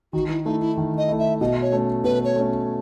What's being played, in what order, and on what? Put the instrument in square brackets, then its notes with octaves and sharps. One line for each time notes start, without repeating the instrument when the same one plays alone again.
[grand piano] D#3 [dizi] F#4
[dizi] E4
[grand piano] A3 E4 [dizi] D#4
[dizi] E4
[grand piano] D#3
[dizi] D#5
[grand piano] A3 E4
[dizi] E5
[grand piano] B2 [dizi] D#5
[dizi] C#5
[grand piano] A3 C#4
[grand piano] B2 [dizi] B4
[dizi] C#5
[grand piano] A3 C#4